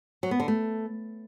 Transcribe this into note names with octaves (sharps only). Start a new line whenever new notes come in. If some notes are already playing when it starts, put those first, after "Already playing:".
F#3
B3
D3
A3